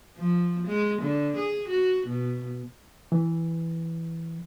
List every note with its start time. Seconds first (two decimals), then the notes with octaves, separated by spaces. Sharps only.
0.18 F3
0.67 G#3
1.02 D3
1.37 G#4
1.69 F#4
2.07 B2
3.12 E3